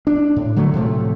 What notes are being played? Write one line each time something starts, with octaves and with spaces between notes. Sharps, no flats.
D4
A2
D3 F#3 A3
A2 C3 F3 A3